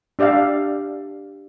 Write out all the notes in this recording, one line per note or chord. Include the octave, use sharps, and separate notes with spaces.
D4 G4 D5 E5 F5